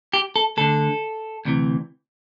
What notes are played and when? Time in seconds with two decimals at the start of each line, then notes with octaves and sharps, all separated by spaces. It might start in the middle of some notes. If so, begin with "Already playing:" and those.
0.13 G4
0.36 A4
0.57 D2 D3 A4
1.45 D2 C3 E3